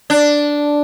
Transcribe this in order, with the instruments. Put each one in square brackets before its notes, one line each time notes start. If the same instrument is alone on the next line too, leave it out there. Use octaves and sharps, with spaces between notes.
[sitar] D4